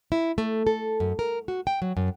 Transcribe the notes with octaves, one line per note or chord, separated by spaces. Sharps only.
E4
A3
A4
F#2
A#4
F#4
G5
F#3
F#2